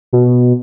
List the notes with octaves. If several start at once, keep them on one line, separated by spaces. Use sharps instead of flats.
B2